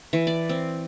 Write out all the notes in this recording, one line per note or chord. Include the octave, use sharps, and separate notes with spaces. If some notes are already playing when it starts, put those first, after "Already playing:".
E3
D5
C4